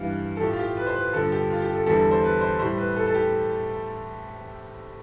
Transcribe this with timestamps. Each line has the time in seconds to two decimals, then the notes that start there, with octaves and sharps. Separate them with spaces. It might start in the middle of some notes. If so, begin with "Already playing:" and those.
Already playing: G2 E3 G3 F5
0.37 A4
0.41 A2 F3 G4
0.53 F4
0.59 G4
0.77 B4
0.87 C5
0.95 B4
1.13 G2 D3 F3 A4
1.32 G4
1.50 F4
1.62 G4
1.75 A4
1.86 E2 D3 G3 A4
2.11 C5
2.23 B4
2.41 C5
2.59 A2 G3 C5
2.78 B4
2.96 A4
3.07 A4
3.15 G4